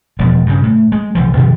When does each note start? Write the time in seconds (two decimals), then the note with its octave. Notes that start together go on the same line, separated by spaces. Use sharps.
0.19 E1 B2 F3 G#3
0.46 G2 C#3
0.63 A2
0.92 G#3
1.15 C2 E3 F3
1.37 B2 D#3 F3 G#3